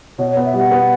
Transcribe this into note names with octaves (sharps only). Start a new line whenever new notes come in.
B2 C#5
C#5
B3
E5
G3 F#5
B3